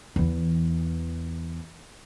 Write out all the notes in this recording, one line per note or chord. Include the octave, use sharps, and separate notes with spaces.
E2 E3